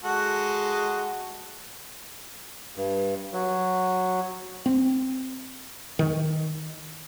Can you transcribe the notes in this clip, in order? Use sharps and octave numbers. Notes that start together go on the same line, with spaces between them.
G#3 F#4 A4
G2
F#3
C4
D#3